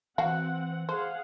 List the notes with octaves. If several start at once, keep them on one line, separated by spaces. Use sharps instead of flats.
E3 C4 F#4 F5 F#5
G#4 C5 F5 F#5